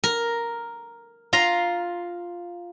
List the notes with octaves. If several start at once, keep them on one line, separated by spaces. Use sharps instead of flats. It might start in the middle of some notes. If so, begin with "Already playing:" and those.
A#4
F4 F5 A#5